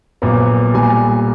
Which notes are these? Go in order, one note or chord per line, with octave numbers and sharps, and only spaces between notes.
A#1 A#2 F#3 B3
B1 A#2 G3 G#5